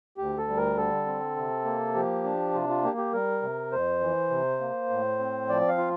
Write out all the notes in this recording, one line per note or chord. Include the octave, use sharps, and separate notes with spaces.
D2 G4
A4
G3
A#4
D3 A4
C4
C3
A#3
F3 G4
D4
C3 F4
F4
A#3 G4
G4
G3 A#4
C3
F2 C5
E3
C3
A#3
A2
C4
F3 D5
F5
F4